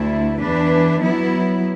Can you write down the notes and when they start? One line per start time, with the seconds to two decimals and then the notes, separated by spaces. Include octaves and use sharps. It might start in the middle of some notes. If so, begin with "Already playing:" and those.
Already playing: D2 D3 A3 E4
0.39 E2 E3 D4 B4
1.01 F#3 B3 E4